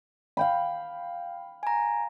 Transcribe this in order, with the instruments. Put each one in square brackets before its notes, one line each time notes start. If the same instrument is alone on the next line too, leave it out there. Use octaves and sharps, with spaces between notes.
[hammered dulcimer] F5 G5 B5
[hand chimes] G#5 A#5